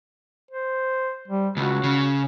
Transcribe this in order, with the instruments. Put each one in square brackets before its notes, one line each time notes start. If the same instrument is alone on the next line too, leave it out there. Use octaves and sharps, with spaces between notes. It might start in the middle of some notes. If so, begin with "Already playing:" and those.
[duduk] C5
G3
[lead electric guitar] C#2 [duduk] F#4
[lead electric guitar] C#3